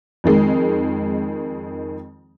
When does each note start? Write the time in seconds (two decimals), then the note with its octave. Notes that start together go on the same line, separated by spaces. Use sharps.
0.24 F2 D#3 G#3